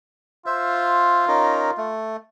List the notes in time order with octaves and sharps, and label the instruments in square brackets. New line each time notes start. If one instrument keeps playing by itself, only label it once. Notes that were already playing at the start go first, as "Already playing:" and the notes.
[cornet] F4 [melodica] C5 E5
[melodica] C#4 D#4 A#4
A3